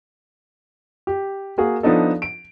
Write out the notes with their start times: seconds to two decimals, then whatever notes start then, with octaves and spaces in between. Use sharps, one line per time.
1.07 G4
1.58 A#3 F#4 G#4
1.83 F3 B3 D4 D#4 A4
2.22 D7